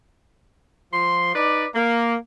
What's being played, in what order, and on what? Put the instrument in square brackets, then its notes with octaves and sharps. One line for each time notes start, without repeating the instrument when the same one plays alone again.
[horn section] F3 C6
D#4 B4 D5
A#3